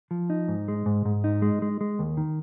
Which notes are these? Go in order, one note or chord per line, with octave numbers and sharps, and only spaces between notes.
F3
D#4
G#2
G#3
G#2
G#2
D#4
G#3
G#3
G#3
D#2
D#3